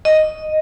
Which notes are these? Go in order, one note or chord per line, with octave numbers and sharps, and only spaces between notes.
D#5